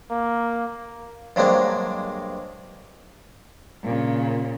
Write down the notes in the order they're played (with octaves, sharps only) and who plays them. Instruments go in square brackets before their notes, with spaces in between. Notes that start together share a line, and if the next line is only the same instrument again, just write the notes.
[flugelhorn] A#3
[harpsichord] G2 F#3 G#3 A#3 C4 D4
[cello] A#2 C#3